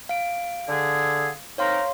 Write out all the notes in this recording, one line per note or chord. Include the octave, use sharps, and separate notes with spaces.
F5 D7
D3 G#4
C4 D#4 A#4 C#5 F5 C6